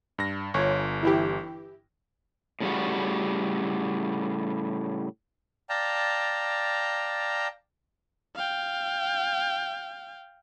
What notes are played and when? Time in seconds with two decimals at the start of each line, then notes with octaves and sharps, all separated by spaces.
0.18 G2 A#6
0.54 G1 F4 C#5
1.03 E3 E4 G4
2.60 A2 C#3 G3 F#4
5.69 D5 F5 G5 A5 A#5
8.36 F5 G5